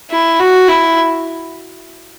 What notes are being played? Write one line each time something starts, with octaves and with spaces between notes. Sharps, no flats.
E4
F#4
E4